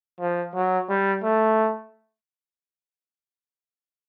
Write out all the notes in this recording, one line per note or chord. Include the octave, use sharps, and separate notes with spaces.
F3
F#3
G3
A3